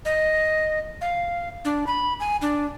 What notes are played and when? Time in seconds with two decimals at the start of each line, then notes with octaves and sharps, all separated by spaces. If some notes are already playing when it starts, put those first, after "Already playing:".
0.05 D#5
1.01 F5
1.65 D4
1.87 B5
2.20 G#5
2.41 D4